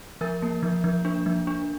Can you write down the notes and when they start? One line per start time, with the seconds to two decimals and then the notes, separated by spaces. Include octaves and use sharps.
0.21 F3 A#4
0.42 A#3
0.63 F3
0.84 F3
1.05 D4
1.26 F3
1.47 D4